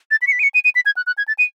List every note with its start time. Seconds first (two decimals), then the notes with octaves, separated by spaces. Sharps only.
0.11 A6
0.22 B6
0.27 C#7
0.32 B6
0.39 D#7
0.43 C#7
0.54 D#7
0.65 D#7
0.75 B6
0.86 G#6
0.97 F#6
1.07 F#6
1.18 G#6
1.28 A6
1.39 D#7